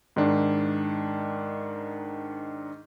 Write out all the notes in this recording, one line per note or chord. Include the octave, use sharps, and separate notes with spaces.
G#2 D#3 D4